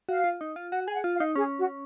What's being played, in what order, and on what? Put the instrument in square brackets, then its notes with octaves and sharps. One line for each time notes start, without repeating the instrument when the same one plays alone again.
[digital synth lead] F#4 [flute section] F5
[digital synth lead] F4
D#4
F4
[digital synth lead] F#4 [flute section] F#5
[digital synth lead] G#4 [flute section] G#5
[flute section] F#5
[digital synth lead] F4
[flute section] F5
[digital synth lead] D#4
[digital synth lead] C#4 [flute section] G#4
[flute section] F#4